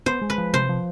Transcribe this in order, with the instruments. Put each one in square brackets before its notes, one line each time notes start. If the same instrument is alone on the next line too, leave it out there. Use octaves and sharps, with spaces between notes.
[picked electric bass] B3 [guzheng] C5
[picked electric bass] G#3
[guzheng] B4
[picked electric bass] F3
[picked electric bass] C3 [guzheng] C5
[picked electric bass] F3